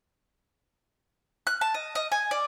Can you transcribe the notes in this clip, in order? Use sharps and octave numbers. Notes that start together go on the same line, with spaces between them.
F#6
A5
D#5
D#5
G#5
D5